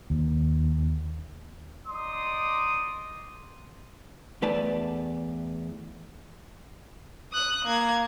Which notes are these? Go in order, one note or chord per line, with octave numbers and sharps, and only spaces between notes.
D#2
D#4 D5 C6 D#6
E2 A3 B4 D5 A5
D#6 F#6
A#3 G#6